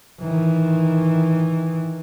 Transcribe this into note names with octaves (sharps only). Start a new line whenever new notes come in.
D#3 E3